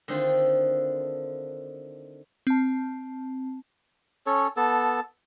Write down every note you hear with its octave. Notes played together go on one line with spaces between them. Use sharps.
D3 D#3 A3 C4 D4 F4
C4 A5
C#4 A4 C#5
B3 A4 A5